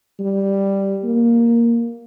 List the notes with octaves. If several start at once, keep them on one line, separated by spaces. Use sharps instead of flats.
G3
A#3